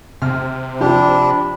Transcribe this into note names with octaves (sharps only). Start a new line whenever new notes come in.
C3 F6
F3 D4 G4 B5